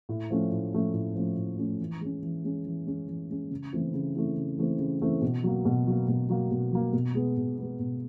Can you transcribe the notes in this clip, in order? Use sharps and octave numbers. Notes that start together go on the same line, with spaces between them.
A2
F3 A3 C#4
A2
F3 A3 C#4
A2
F3 A3 C#4
A2
F3 A3 C#4
E3
G#3 C#4
E3
G#3 C#4
E3
G#3 C#4
E3
G#3 C#4
C#3
E3 A3 C4 E4
C#3
E3 A3 C4 E4
C#3
E3 A3 C4 E4
C#3
E3 A3 C4 E4
B2
F#3 A#3
B2
F#3 A#3
B2
F#3 A#3
B2
F#3 A#3
B2
G#3 B3
B2
G#3 B3
B2